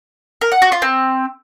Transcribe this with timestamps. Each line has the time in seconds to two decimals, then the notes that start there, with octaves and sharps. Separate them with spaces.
0.41 A#4
0.52 F#5
0.62 F#4
0.72 F4
0.82 C4